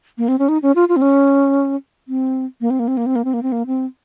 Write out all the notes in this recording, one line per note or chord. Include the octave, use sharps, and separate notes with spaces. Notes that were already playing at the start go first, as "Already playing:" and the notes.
A#3
C4
C#4
D#4
C#4
F4
F4
C4
C#4
C4
A#3
C4
A#3
C4
A#3
C4
A#3
C4
A#3
C4
A#3
C4